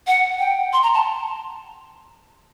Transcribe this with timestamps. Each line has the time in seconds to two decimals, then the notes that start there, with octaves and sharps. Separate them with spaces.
0.07 F#5
0.39 G5
0.73 C6
0.83 A#5
0.94 A5